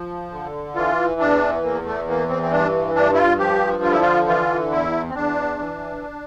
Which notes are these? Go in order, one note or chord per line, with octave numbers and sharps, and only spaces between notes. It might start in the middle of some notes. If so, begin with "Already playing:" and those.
Already playing: F3
D3
E3 F4
E2 D4
E2 A#3
A3
E3 A#3
C4
C4
G2 D4
G2 D4
E4
F4
F3 G4
D3 F4
E4
F4
E3 F4
E2 E4
C4
E2 D4
E3